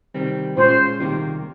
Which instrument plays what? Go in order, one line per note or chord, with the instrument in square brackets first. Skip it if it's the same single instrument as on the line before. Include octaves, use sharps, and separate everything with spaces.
[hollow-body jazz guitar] C3 D#3 G3 C4
[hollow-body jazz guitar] A#2 G#3 C#4 F4 G#4 [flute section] C5
[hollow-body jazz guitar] C2 C3 D#3 G3 A#3